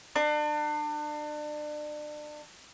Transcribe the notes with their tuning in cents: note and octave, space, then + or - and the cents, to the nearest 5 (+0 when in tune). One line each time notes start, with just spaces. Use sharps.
D4 +35